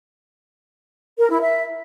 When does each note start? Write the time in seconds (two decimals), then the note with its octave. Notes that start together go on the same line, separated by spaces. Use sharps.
1.18 A#4
1.30 E4
1.41 E5